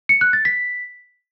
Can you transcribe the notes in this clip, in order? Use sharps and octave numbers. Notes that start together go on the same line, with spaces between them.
C#7
F#6
A6
B6